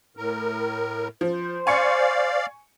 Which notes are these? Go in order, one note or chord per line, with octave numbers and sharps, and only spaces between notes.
A2 A#4
F3 C5
D5 F5 G#5 C#6 C#7